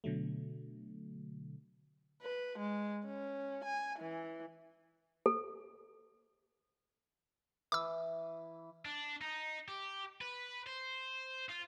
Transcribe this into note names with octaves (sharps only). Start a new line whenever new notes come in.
B2 D3 F#3 A3
B4
G#3
C#4
G#5
E3
A4
E3 D6 E6
D4
D#4
G4
B4
C5
F4